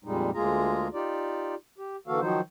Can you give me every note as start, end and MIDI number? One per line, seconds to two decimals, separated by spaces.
0.04 0.31 41
0.04 0.31 46
0.04 0.31 55
0.04 0.31 56
0.04 0.31 63
0.34 0.88 38
0.34 0.88 56
0.34 0.88 58
0.34 0.88 65
0.34 0.88 68
0.34 0.88 82
0.93 1.55 63
0.93 1.55 65
0.93 1.55 67
0.93 1.55 74
1.78 1.96 67
2.07 2.20 50
2.07 2.20 52
2.07 2.20 58
2.07 2.20 66
2.07 2.20 69
2.07 2.20 77
2.21 2.41 51
2.21 2.41 53
2.21 2.41 54
2.21 2.41 63
2.21 2.41 72